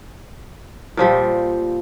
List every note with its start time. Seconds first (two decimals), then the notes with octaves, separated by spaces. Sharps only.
0.97 A#2 F3 G3